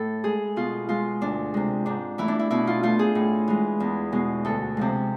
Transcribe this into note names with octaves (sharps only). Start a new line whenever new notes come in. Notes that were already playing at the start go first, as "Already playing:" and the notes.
Already playing: A2 A4
G#3 G#4
B2 F4
G#3 F4
D2 D4
C3 G#3
G#2 D4
E3 A3 E4
D4
E4
B2 E4
F4
A3 F4
G#4
A2
E3 G#3
E2
B2 G#3
D2 A4
C3 F3 G#3